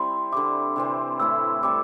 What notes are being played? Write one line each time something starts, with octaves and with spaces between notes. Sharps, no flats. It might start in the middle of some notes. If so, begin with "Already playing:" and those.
Already playing: G3 C4 E4 C6
D3 G3 E4 D6
C3 E3 C4
A2 A3 E4 E6
G3 C4 A4 D6